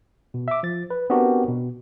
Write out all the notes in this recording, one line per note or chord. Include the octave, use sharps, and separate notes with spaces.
B2
E5 D6
F3 A6
B4
B3 C4 D4 F#4 G4 A#4
B2